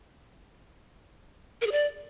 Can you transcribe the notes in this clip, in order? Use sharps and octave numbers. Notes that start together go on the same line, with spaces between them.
A#4
G#4
D5